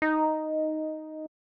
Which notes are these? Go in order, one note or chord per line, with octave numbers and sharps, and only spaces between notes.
D#4